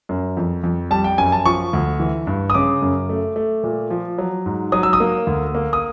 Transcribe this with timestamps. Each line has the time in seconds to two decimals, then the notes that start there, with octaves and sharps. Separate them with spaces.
0.09 F#2
0.37 F2
0.64 F2
0.91 G3 A5
1.04 G5
1.18 F#2 G#5
1.32 A5
1.45 F3 C#6
1.73 D2
2.00 E3
2.27 G2
2.50 D#6
2.54 C#3 D6
2.82 F#2
3.09 A3
3.36 A3
3.64 A#2
3.90 F3
4.18 F#3
4.46 G#2
4.72 F#3 D#6
4.83 E6
4.93 D#6
5.00 A#3
5.27 D2
5.55 A#3
5.73 D#6